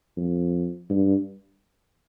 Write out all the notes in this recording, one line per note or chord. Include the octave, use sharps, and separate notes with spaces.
F2
G2